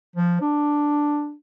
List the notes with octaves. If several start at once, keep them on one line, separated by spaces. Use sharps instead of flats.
F3
D4